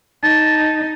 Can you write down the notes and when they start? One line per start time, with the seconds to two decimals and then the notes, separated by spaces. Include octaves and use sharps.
0.23 D#4 A5